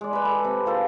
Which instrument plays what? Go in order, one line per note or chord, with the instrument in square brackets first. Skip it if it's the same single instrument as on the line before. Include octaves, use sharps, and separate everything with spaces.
[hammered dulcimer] G#3 D5
B4 B5
A4
C3
F4 A4 C5